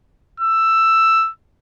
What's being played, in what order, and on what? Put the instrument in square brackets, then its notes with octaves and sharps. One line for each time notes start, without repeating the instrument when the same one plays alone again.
[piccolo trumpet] E6